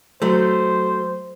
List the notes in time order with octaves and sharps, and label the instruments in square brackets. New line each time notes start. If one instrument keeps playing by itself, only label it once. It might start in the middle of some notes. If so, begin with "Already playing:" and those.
[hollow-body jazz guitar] F#3 A3 [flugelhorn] C5